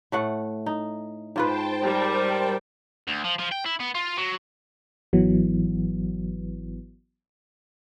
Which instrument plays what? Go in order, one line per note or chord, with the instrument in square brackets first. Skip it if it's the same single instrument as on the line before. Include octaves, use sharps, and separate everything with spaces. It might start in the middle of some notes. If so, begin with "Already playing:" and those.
[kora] A2 A3 F#5
D#4
[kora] G#2 F4 B4 [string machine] C5 G5 A5
[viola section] G3 A#4
[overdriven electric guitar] D2
F3
F3
G5
E4
B3
F4
F#3
[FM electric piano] G#1 E3 F#3 B3